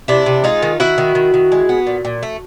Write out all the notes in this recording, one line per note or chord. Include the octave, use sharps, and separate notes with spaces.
C3 D4 E4
C3
G#3 D#4 F4
D#3
D#3 E4 F#4
D#3
D#3
D#3
G#3
B3
A#2
A#2
A3